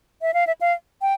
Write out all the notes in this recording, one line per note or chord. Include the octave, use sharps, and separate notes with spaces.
E5
F5
E5
F5
G5